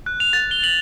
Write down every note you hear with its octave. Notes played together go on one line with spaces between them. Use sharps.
F#6
F7
A6
G7
F#7